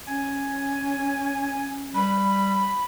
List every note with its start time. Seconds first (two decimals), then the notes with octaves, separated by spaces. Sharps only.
0.08 C#4 G#5
1.94 G3 B5